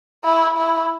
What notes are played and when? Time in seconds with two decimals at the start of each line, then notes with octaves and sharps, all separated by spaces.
0.24 E4
0.57 E4